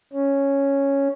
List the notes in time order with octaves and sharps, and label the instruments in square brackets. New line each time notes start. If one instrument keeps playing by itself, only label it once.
[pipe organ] C#4